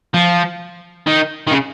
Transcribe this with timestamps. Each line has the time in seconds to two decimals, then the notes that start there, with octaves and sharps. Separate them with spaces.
0.14 F3
1.07 D#3
1.47 D#3
1.52 C#3